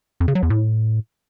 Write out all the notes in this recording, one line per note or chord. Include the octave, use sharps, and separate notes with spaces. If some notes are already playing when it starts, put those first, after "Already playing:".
F2
C#3
F#3
E2
A2